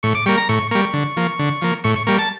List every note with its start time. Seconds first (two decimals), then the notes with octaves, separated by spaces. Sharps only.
0.03 A2 C#6
0.15 D6
0.26 G3 A#3 C#6
0.38 A#5
0.49 A2 C#6
0.71 G3 A#3 C#6
0.94 D3
1.17 F3 A#3
1.39 D3
1.62 F3 A#3
1.84 A2 C#6
1.96 C#6
2.07 G3 A#3 C#6
2.19 A5